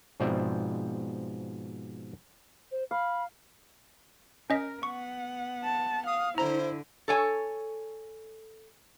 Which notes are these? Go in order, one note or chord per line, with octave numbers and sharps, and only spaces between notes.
G#2 B2 F3 C4 D5 E5
C5
F5 B5
C#4 A#4 D#5 B6
B3 F#5 C#6
A5
F5 D#6
D3 E4 C5 A#5
A4 C#5 G#5